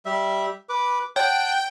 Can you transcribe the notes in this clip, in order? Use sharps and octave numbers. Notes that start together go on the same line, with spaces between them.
G3 E5
B4 D6
C#5 F#5 G5 A5